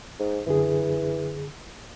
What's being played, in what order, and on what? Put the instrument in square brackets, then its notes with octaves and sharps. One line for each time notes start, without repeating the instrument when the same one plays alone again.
[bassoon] G#2
[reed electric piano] F#2 D3 G#4 [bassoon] E3